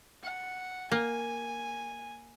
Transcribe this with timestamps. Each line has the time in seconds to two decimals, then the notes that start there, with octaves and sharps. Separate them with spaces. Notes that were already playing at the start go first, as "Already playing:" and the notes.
0.23 F#5
0.92 A#3 G#5